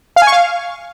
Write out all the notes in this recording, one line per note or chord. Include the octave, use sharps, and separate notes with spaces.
F5
G#5
C#6
F5